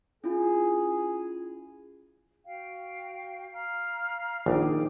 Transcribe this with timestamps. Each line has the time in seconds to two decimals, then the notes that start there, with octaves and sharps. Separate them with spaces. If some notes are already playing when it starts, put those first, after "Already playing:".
0.24 C#4 E4 F4 G#4
2.44 F#4 F5 G5
3.52 F5 A#5 F6
4.46 A#1 D#3 G#4 G5 D6